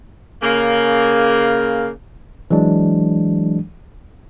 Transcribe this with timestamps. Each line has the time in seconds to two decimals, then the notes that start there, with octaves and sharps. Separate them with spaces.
0.42 C#3 A#3
2.51 E3 F#3 G#3 D4